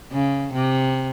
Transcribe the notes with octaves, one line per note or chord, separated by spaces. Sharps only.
C#3
C3